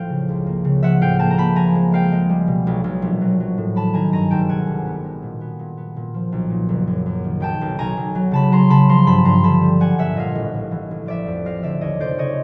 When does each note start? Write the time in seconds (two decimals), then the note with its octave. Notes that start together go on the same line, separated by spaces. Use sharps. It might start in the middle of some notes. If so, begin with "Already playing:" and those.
Already playing: A1 F3 F5 G5
0.09 C#3
0.29 C#2
0.46 A#3
0.64 C#3
0.82 F3 E5 F#5
1.01 A2 F5 G5
1.19 A#3 G5 A5
1.31 A#5
1.37 A#3 A5 B5
1.56 F3 G#5 A#5
1.75 G#3
1.92 G#3 F5 G5
2.12 G#3
2.29 G3
2.47 B2
2.67 B1
2.84 B1
3.02 A#1
3.21 F#3
3.40 F#3
3.57 A2
3.76 D#3 A5 B5
3.94 D#3 G#5 A#5
4.12 G2 G#5 A#5
4.31 G#1 G5 A5
4.49 B2 F#5 G#5
4.67 C2
4.86 B3
5.04 G#3
5.22 A#2
5.41 B3
5.59 A#2
5.77 B3
5.96 A#2
6.14 F3
6.32 B1
6.50 A#2
6.69 F#1
6.87 F#2
7.06 F#2
7.24 D#3
7.40 B1 G5 A5
7.61 B1
7.78 B1 G#5 A#5
7.97 B1
8.15 F#3
8.31 C#3 A5 B5
8.52 F#3 A#5 C6
8.70 C#3 A5 B5
8.89 F3 A#5 C6
9.06 G2 A5 B5
9.25 G2 A#5 C6
9.43 D3 A5 B5
9.62 G3
9.80 G3 F#5 G#5
9.98 A#1 E5 F#5
10.15 A#2 D#5 F5
10.35 A1
10.54 A1
10.71 E3
10.91 A1
11.06 F3 D5 E5
11.27 F2
11.45 F3 D#5 F5
11.63 D3 D5 E5
11.81 D#2 C#5 D#5
12.00 F1 C5 D5
12.18 C#3 C#5 D#5